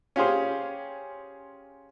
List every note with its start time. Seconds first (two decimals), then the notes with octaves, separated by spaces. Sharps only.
0.16 C#4 F4 G4 G#4 C5